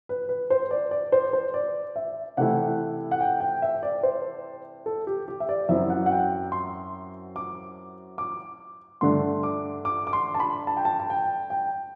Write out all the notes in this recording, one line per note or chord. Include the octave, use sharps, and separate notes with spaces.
B4
B4
C5
D5
D5
C5
C5
D5
E5
C3 E3 A3 E4 F#5
F#5
G5
G5
E5
D5
C5
A4
G4
G4
E5
D5
F#2 F#3 C4 E4 E5
F#5
F#5
G5
C6
D6
D6
G2 D3 A3 D4 C6
D6
D6
D6
C6
A5
B5
A5
G5
A5
A5
G5
G5